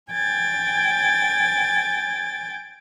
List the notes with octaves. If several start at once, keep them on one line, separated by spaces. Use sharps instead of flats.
G5 G#5 G#6 A6